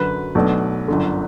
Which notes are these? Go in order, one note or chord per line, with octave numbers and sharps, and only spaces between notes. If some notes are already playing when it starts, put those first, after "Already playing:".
Already playing: F#2 D3 F#3 B4
B1 B2 A3 D4
G1 F#2 D3